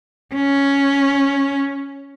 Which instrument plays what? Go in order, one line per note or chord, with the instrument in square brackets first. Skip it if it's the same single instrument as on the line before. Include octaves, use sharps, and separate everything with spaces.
[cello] C#4